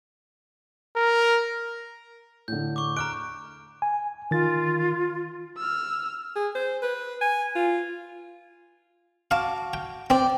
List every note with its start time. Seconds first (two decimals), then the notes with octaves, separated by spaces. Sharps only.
0.96 A#4
2.48 A2 D3 G6
2.76 C#6 D6
2.97 A#5 C#6 D6 F6 F#6 D7
3.82 G#5
4.31 D#3 F4 A6
5.57 E6 F6
6.36 G#4
6.55 C5
6.82 B4
7.21 G#5
7.56 F4
9.31 F#4 F5 A5 D6
9.74 G5
10.10 C4 D5 G5